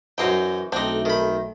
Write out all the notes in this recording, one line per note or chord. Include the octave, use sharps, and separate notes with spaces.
F#2 E3 D#4 F#4 C5 G5
B1 A3 C4 D4 D#4
D#3 B5